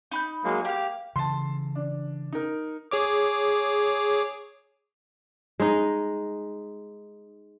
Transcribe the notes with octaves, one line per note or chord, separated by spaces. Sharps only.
D#4 B5 G6
F#3 G#3 A#3
A#3 G4 F5
C#3 E3 A5 C6
D4
D#4 A#4
G#4 C#5 D6
G#3 D#4